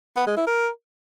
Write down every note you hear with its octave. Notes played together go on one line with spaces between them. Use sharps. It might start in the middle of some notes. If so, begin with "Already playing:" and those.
B3
G#3
E4
A#4